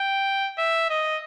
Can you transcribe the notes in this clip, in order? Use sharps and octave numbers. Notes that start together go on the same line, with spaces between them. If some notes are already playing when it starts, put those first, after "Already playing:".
Already playing: G5
E5
D#5